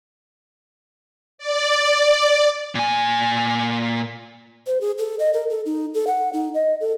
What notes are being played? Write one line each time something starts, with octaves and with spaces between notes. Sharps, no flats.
D5
A#2 G#5
C5
G#4
A4
D#5
A#4
A4
D#4
A4
F#5
D#4
D#5
A4